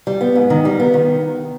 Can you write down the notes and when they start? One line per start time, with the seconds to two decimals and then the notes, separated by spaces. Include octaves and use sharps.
0.07 G3
0.21 B3
0.35 G#2
0.50 D#3
0.65 G3
0.80 B3
0.94 D#3